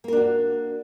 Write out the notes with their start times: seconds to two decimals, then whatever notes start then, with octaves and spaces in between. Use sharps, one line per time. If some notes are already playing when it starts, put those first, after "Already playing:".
0.04 A#3
0.08 A#4
0.13 D4
0.17 F#4